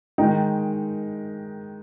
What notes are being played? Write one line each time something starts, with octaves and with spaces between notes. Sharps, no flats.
D#3 G#3 D#4 G5